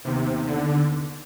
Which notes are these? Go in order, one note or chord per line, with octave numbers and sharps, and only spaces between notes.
D#2 C3 D#3 B3
D3